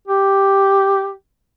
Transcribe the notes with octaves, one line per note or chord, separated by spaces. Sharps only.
G4